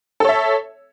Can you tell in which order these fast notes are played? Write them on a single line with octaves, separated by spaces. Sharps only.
A4 C#5 E5